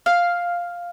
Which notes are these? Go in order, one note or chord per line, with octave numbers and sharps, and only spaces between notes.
F5